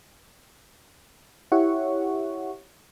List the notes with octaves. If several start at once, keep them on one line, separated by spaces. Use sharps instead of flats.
E4 G4 C#5 E5 F#5 C#6